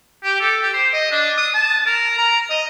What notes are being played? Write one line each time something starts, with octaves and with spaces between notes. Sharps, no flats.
G4
A4
G4
C5
D#5
D4
D#6
A5
A#4
A#5
D#5